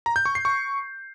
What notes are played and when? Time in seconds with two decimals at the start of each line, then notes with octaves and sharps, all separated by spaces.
0.06 A#5
0.16 G6
0.26 C#6
0.35 C7
0.45 C#6